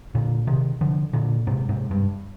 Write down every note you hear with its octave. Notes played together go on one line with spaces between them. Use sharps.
A#2 D3
C3 D#3
D3 F3
A#2 D3
G#2 C3
G#2 C3
G2